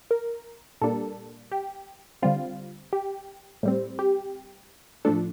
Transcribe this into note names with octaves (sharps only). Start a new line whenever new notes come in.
A#4
A#2 G3 A#3 D4 A4
G4
D3 G3 C4 F4
G4
A2 G3 C4
G4
A2 F3 A3 D4 A4